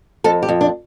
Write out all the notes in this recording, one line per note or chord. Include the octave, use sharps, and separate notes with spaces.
F2 A4
G4
F2
D4